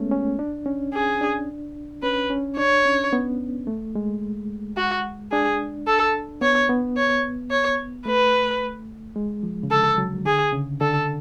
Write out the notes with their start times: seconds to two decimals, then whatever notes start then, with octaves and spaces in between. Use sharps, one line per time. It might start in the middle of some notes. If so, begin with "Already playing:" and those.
Already playing: G#3 A3 B3 C#4
0.12 C#4
0.39 D4
0.66 C#4
0.93 G#4
1.21 D4
2.03 C#4 B4
2.30 C#4
2.57 D4 C#5
2.85 C#4
3.13 B3
3.67 A3
3.95 G#3
4.77 F#4
5.32 D4 G#4
5.87 A4
6.41 B3 C#5
6.69 B3
6.97 C#5
7.51 C#5
8.06 A3 B4
9.16 G#3
9.43 F3
9.63 C#3
9.70 D3 A4
9.98 F#3
10.25 D3 G#4
10.53 C#3
10.81 D3 A4